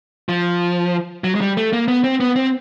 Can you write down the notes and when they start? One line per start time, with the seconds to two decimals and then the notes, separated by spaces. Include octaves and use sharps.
0.29 F3
1.24 F#3
1.35 G#3
1.41 G3
1.57 A3
1.73 A#3
1.88 B3
2.04 C4
2.20 B3
2.36 C4